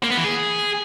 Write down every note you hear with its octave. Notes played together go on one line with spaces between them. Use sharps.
A#3
B3
E3
G#4